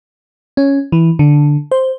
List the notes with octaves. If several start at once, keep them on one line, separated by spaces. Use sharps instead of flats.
C#4
E3
D3
C5